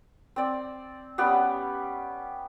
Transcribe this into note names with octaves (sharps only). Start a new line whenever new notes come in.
C4 D5
G3 B3 C#4 G4